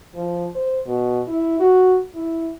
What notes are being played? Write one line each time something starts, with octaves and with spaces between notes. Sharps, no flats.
F3
C5
B2
E4
F#4
E4